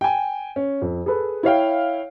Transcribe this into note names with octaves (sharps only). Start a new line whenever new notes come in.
G5 G#5
C#4
F2
G#4 A4 B4
E4 C#5 F5 G5